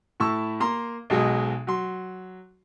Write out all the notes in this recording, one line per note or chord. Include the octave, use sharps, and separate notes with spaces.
A2 E4 A5 C#6 E6
A#3 A#5 C6
B1 F#3 G#3 D#5
F#3 C6